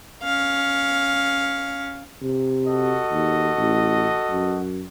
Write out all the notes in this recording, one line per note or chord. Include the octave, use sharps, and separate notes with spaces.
C#4 F5
C3
F#4 A4 D#5
D#2
A1
F#2